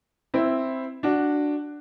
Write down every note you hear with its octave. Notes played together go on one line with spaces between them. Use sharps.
C4 E4
D4 F#4